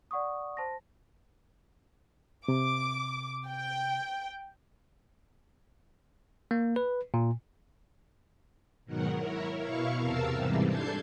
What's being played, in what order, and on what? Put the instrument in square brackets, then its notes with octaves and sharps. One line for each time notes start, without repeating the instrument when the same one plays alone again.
[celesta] D5 F#5 C#6 D#6
C5 A5 C6 A#6
[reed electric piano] C3 [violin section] D6
[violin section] G5
[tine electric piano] A#3
B4
A#2
[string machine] G#2 B2 D#3 F#3 A#4 F#5
E4 A#4 C#5
B2 E4 F5 C#6
E2 C3 A#4 F5 A5 E6
G#2 C3 E3 G3
D4 A4 A5 G6 G#6 C7